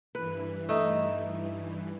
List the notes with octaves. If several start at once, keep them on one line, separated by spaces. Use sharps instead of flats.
G2 E3 B4
A3 D#4